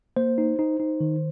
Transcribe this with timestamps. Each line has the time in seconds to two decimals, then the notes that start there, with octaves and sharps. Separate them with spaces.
0.17 A#3 C5
0.38 D#4
0.59 D#4
0.80 D#4
1.00 D#3